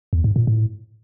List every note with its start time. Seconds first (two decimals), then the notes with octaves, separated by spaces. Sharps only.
0.13 E2
0.24 G#2
0.36 A#2
0.47 A2